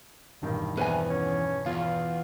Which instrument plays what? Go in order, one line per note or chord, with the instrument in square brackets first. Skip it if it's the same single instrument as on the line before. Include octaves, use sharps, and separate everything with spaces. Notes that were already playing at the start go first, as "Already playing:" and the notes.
[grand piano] E1 G2 D#3
[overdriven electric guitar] E2 [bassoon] C3 [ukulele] B4 G#5
[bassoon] C#4
[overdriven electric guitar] E2 [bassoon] F4